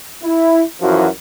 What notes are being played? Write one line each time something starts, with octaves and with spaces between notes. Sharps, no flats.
E4
F#2 E3 F3 E4 F#4